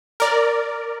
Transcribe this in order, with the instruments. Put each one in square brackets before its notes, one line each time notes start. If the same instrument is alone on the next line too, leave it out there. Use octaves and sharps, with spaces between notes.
[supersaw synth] A#4 D5